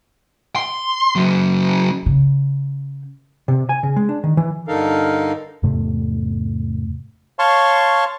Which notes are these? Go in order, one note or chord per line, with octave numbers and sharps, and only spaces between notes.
C6
C#3 F#3
C#3
C3
G#5
C#3
G#3
D4
D#3
E3
G2 D3 D#4 A4 A#4 F5
E2 G#2 C3 A3
C#5 F5 A5 C6 C#6